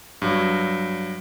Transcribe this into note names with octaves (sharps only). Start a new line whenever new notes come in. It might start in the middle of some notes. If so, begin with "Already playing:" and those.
G2 F#3